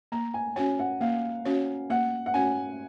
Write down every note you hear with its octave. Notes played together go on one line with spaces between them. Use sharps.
A#3 A#5
G#5
C#4 F#4 C#5 G#5
F#5
A#3 F5
C#4 F#4 C#5
A#3 F#5
F#5
C#4 F#4 C#5 G#5